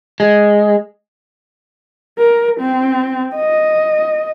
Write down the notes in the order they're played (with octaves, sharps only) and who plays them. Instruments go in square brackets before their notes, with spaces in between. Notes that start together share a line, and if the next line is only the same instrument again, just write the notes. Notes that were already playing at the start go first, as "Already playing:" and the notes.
[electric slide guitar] G#3
[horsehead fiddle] A#4
C4
D#5